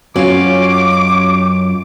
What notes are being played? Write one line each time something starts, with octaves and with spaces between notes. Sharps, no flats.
F#2 C#4 F4 F#4 C#5 D6